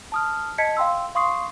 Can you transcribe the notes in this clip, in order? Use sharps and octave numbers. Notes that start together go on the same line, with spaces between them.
A5 D#6 F6
D#5 A5 G#6 B6 C#7
F5 G5 C6 E6
F5 C6 C#6 D#6 C7